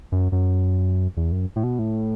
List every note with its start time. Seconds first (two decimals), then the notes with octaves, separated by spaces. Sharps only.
0.12 F#2
0.32 F#2
1.17 E2
1.32 F#2
1.56 A2
1.64 B2
1.79 A2